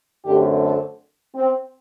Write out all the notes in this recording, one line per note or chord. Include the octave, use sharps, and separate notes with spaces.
F#2 D3 A3 C4 G4
A4
C4